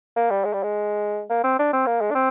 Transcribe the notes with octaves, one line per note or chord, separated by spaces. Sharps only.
A#3
G3
G#3
G3
G#3
A#3
C4
D4
C4
A#3
G#3
D4
C4